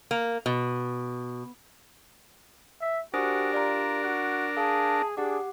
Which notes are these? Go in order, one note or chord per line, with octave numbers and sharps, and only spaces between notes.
A#3
B2
E5
D4 F#4 G4 A#4 C5 G#5 D#6
F4 D5 A#5
F#4 F#6
G#4 F5 A5
D4 G4 G#4 F#5 D6